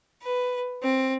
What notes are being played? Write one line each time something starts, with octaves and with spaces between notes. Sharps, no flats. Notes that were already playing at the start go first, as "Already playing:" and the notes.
B4
C4